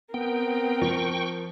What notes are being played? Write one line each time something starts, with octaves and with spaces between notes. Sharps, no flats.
B3 C4 A#4 G5
F3 G5 C#6